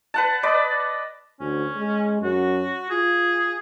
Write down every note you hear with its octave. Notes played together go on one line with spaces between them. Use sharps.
B4 F#5 A5
B4 D5 D#5 B5
D2 C#4
G#3
F#2 F#4
F4 G#4